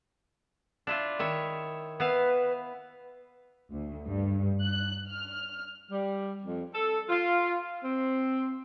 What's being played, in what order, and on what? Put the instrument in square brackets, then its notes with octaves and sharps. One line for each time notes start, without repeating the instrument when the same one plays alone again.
[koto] D4 E4 F4
D#3 E4 C#5
[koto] B3 E4 F5 [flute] B4
[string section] D2
G2
F#6
F6
[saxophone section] G3
F2
A4
F4
C4